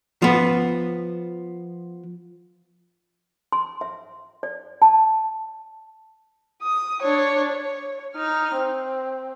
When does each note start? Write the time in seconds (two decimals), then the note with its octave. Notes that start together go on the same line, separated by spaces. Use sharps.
0.22 F3 B3
3.52 C6
3.81 E5
4.43 D5
4.82 A5
6.63 D#6
7.02 D4 C#5
7.51 C#5
8.15 D#4 F6
8.56 C4